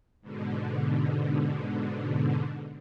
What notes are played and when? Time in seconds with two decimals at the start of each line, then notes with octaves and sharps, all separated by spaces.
0.21 G#2 B2 D3